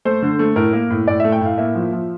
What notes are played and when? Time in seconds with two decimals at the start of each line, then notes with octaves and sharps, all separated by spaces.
0.05 A3 C5
0.22 D3
0.39 A3
0.56 A2 A#4
0.73 A#3
0.90 A2
1.07 A2 D5
1.20 E5
1.24 A3
1.32 G5
1.41 A2 F5
1.58 A#3 E5
1.75 F3
1.92 F3